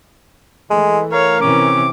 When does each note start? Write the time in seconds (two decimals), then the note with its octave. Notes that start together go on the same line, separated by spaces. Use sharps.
0.70 E3 G#3 A3
1.12 A#4 C#5 F5
1.41 C3 E3 C4 C#4 D6